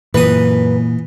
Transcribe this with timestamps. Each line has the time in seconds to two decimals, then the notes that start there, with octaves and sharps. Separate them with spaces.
0.14 F#2 A#2 E3 B3 B4 D#6